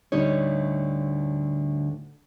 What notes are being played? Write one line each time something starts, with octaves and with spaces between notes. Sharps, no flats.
D2 A2 D3 G3 D#4 C#5